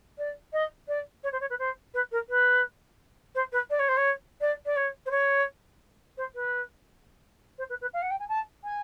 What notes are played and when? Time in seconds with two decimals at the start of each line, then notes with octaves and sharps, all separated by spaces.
0.18 D5
0.52 D#5
0.88 D5
1.23 C#5
1.32 C5
1.40 C#5
1.49 B4
1.58 C5
1.94 B4
2.11 A#4
2.29 B4
3.34 C5
3.52 B4
3.70 D5
3.79 C#5
3.88 C5
3.97 C#5
4.40 D5
4.65 D5
4.76 C#5
5.05 C5
5.10 C#5
6.17 C5
6.34 B4
7.58 C5
7.69 B4
7.81 B4
7.93 F5
8.01 F#5
8.10 G5
8.19 G#5
8.28 A5
8.63 G#5